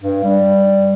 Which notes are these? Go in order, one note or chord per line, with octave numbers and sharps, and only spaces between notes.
G2
G3